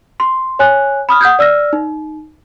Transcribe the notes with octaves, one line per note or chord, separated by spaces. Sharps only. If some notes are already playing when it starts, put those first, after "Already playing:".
C6
C#5 G#5 F#6
B5 D#6 F6
F#5 D#6 G6 G#6
D5 E6 F6 A#6
D#4